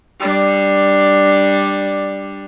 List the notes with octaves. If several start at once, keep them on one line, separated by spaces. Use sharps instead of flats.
G3 D4